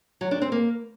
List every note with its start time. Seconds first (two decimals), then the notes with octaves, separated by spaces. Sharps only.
0.21 F#3
0.31 D4
0.42 C4
0.52 A#3